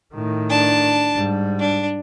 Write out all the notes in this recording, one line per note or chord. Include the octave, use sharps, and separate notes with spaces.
A2 D#3
D4 A5
G#2 G3
D4